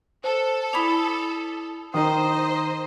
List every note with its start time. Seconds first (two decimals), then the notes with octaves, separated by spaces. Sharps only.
0.24 A4 C5
0.73 E4 D5 G#5 B5 D#6 F7
1.94 D#3 D#4 C5 D#5 D#6